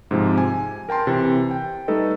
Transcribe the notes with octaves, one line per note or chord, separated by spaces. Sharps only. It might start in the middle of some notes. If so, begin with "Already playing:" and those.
G#2 C3 F3
G#5
A#4 G5 A5 C6
C3 E3
G5
G3 A3 D#4 A4 B4 D#5